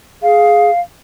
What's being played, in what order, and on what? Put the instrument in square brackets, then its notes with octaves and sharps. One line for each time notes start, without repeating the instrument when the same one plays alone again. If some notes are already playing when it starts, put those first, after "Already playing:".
[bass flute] G#4 [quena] F5